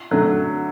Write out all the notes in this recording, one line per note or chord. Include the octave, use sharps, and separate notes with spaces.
D3 F#3 A3